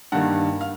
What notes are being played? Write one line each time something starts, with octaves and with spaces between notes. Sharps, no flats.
G2 D#3 G3 A#3 F#5
F5